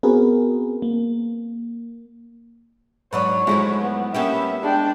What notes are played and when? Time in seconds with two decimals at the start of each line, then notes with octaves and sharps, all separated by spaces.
0.03 B3 C4 F#4 G#4 A#4 B4
0.82 A#3
3.13 G#2 F#3 D4 B4 C#5 D5
3.47 G#2 F3 F#3 G#3 A3 E4
3.82 B3
4.14 G3 A#3 B3 C#4 E4 G4 E5
4.63 G#3 D4 G5